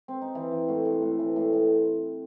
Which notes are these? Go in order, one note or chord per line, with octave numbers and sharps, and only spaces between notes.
C4
D#4
E3 E4
E3
A2 F#4
A2
A2
E3
A2
A2